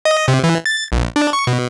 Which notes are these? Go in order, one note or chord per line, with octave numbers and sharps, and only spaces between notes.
D#5
C3
E3
A6
A#1
D4
C#6
B2